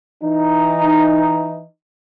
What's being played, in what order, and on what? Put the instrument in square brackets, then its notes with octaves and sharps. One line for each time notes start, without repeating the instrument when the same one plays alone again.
[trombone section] E3 D#4